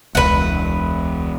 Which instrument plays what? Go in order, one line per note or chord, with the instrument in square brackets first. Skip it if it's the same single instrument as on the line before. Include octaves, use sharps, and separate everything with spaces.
[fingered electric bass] E1 [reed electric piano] C#2 [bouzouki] B4 F#5